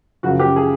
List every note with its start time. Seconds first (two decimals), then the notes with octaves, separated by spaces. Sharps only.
0.23 F#2 C#3 F3 F#4
0.39 G4
0.56 G#4